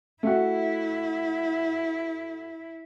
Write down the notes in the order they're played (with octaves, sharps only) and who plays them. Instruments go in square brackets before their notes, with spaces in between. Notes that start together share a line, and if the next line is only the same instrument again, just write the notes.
[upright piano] A3 F#4 [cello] E4